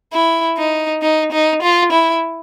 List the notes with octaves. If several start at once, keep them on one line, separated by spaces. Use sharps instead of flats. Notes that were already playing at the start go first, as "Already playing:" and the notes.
E4
D#4
D#4
D#4
F4
E4